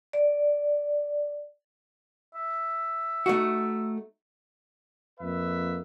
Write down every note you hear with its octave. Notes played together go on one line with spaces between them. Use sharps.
D5
E5
A3 D#4 F#4
F2 A#3 B4 E5